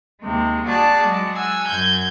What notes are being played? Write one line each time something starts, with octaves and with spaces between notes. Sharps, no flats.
D#2 C3 G#3
F#4 G#4 D5 A5 F#6
F#3 G#3
F#5 G#5 E6
F#2 G6 G#6